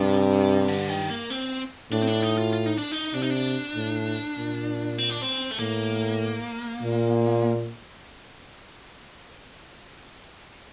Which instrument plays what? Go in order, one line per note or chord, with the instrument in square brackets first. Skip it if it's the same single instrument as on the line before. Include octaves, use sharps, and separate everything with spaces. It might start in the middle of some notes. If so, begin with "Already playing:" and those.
Already playing: [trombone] G2 [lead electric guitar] C3
[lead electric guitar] D3
D#3
A#3
C4
[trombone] A2 [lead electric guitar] D4
[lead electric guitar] C4
D4
D#4
F4
F4
D#4
D4
D#4
[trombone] C3 [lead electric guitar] D4
[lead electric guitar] D#4
D4
[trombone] A2
A#2
[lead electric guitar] C4
D4
C4
A3
[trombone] A2 [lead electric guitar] A#3
[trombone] A#2